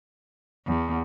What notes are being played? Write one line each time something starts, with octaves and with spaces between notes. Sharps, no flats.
E2